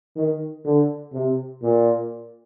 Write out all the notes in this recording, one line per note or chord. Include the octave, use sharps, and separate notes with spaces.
D#3
D3
C3
A#2